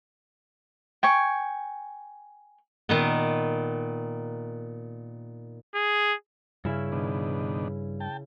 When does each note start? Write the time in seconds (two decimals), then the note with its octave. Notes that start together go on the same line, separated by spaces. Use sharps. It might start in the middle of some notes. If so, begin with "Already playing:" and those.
1.03 G5 G#5 C#6
2.89 A#2 D#3 B3
5.75 G#4
6.65 G2 C#3 E4
6.92 B2 D#3 D4
8.00 G5 A5